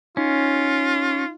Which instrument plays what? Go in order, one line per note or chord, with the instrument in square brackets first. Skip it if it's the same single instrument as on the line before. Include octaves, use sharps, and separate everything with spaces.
[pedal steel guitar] C#4 [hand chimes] D#4 [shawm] F4